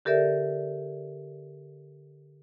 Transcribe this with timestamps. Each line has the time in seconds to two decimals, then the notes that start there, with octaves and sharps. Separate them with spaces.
0.05 D3 G4 A4 A#4 D5 E5